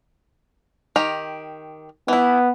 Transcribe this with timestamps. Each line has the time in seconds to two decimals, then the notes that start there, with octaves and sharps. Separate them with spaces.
0.96 D#3 G4 A#5
2.08 E3 B3 E4